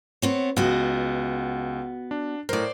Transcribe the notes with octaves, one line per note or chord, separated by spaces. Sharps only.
B3 C4 C#5
C#2 B3 F#4 D#5
D4
A2 A#4 C5 D5